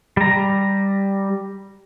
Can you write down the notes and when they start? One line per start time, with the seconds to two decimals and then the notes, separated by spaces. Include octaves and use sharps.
0.17 G3 A#5